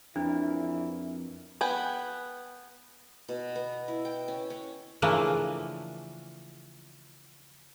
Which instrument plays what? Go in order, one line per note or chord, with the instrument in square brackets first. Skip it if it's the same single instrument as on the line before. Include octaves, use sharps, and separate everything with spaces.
[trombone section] A#1 E3 E4 [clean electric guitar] F2 A#4 [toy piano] D4
[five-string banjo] B3 B4 G5 G#5
[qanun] B2
B3
E4
G5
C#4
C#4
[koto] C#3 E3 F3 A3 A#3 D4